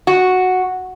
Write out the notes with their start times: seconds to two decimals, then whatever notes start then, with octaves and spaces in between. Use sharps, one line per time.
0.07 F#4